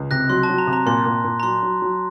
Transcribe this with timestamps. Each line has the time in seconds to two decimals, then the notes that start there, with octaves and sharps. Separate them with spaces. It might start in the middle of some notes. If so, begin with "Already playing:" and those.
Already playing: C#2
0.11 C3 F#6 A#6
0.30 F#3 C6
0.43 A5
0.49 F#3
0.58 A#5
0.67 C3
0.73 A#5
0.86 A#2 C6
1.06 A#2
1.24 A#2
1.40 A#5
1.43 F#3 C6
1.63 F#3
1.82 F#3